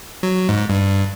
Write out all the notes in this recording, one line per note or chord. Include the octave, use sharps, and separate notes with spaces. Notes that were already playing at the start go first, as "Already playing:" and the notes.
F#3
G#2
G2